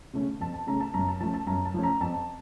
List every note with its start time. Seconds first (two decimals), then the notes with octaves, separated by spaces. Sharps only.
0.14 C#3 A3 C#4
0.40 F2 A5
0.54 A5
0.67 C#3 A3 C#4 A#5
0.80 A5
0.94 F#2 A#5
1.08 A5
1.20 F3 A3 C#4 A5
1.34 A5
1.47 F#2 A#5
1.65 A5
1.74 F3 A3 C#4
1.83 A#5
2.01 F2 A5